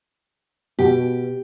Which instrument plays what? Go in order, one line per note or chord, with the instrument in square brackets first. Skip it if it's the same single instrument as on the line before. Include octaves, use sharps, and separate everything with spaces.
[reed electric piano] B2 [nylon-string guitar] G4